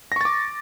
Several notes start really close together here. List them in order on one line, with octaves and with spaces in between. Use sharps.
A#6 C#6 A6 D6